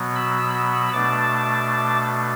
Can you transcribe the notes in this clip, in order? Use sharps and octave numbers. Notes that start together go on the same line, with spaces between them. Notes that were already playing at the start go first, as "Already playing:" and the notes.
Already playing: B2 F#3 B3
B5 E6
B5 E6
B2 A3 D4 A5 D6